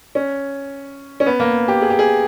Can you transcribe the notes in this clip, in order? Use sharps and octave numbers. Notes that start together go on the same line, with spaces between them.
C#4
C#4
B3
A#3
G4
G#4
G4
G#4